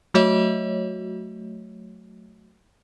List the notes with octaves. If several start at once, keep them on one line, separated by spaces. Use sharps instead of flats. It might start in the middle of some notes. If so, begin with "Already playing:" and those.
F#3 A3 F#4 C#5 D#5 E5